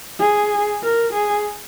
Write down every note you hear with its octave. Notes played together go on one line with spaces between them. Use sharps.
G#4
A#4
G#4